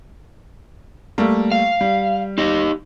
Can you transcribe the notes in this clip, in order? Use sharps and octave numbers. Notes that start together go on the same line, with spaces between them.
G3 A3 A#3
F5
G3
D#4 G4 D#5